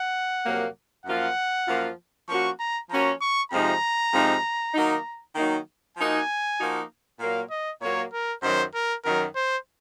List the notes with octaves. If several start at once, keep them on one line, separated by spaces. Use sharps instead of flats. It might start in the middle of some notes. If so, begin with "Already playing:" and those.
Already playing: F#5
F2 C3 F#3 A#3
F#2 F3 A#3 F4 F#5
F#2 F3 A#3 F4
F3 A#3 C#4 F#4 C#6
A#5
F3 A#3 C#4 F#4 A#5
C#6
F2 C3 F3 G#3 D#4 A#5
F2 C3 F3 G#3 D#4
D#3 F#3 A#3 D#4
D#3 F#3 A#3 D#4
F3 A#3 D#4 F#4 G#5
F3 A#3 D#4 F#4
A#2 F#3 A#3 F5
D#5
A#2 F#3 A#3 C#5
A#4
F#2 D#3 F#3 C5
A#4
F#2 D#3 F#3 A#4
C5